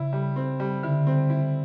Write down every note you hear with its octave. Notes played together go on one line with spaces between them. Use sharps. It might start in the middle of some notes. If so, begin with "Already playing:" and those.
Already playing: C#3 E4
G3
C4
G3
D3 E4
C4
E4